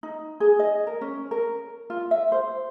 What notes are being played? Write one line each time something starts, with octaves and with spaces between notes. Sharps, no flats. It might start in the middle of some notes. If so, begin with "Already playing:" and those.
D#4
G#4
D#5
A#4
C#4
A#4
F4
E5
C5